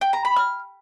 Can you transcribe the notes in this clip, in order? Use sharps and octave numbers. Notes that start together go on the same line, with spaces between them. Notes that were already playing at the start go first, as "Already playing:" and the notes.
G5
A#5
B5
F6